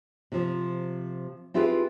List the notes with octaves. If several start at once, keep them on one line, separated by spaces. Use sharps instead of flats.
C3 F3
C4 E4 F4 G4 G#4 B4